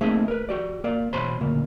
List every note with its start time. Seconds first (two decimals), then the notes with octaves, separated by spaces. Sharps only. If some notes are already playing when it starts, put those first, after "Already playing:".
0.01 A3 A#3 C4 D#4 G#4 E5
0.28 A#4 B4
0.49 F#4 G4 D5
0.84 A#3 A#4 D5 F5
1.13 E2 B2 C5 C#5 B5 C6
1.41 D2 A#2 C#3 A#3